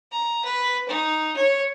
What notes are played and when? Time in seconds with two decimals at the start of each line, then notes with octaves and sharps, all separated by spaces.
0.12 A#5
0.45 B4
0.88 D#4
1.36 C#5